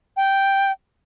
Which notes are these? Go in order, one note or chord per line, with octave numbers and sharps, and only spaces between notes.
G5